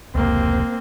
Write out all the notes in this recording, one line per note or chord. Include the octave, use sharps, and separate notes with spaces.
F1 C#2 A#3 C4